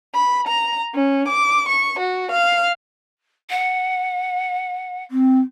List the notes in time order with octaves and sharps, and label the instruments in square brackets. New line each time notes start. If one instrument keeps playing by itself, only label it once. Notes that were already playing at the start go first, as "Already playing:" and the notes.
[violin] B5
A#5
C#4
D6
C#6
F#4
F5
[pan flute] F#5
[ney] C4